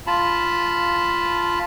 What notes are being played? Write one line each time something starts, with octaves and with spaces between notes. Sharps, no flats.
F4 A5 B5